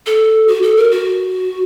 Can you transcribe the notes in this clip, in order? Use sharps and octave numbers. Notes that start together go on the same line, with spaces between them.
A4
F#4
A4
A#4
F#4